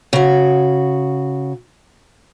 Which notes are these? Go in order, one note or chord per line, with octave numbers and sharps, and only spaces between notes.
C#3 F#4